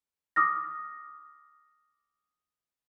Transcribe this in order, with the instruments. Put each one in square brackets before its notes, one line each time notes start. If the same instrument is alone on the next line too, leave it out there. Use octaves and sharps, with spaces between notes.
[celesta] D6 D#6 F6 A#6